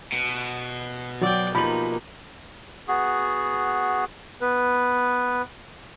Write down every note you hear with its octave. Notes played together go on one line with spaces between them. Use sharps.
B2
F#3 D5 G5
F3 A#3 D#4 G4 B5 F#7
B3 F#4 G#4
B3 B4